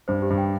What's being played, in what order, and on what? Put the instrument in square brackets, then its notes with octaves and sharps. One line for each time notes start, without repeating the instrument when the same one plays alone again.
[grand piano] G2 [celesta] C5
[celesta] G4
[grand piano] G2
[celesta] G5